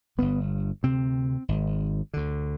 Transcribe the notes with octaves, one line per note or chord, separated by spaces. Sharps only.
G1 G2 D3 B3
D2 C3 C4
G#1 G#2
D2 D3